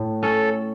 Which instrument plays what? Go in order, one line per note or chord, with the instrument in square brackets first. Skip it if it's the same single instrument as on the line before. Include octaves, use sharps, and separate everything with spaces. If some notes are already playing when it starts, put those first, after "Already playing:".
Already playing: [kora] A2
[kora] C#4 [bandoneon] A4